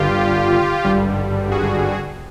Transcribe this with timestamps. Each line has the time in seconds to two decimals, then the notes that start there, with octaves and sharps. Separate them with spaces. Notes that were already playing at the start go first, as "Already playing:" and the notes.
Already playing: G1 G2 D3 F4 G4
0.84 G#1 G2 D3 G3
1.51 F#4 G#4